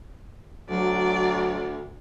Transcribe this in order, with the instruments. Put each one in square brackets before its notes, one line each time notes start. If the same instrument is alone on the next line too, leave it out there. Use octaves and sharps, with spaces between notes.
[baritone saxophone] D2 [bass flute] F#3 [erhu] D5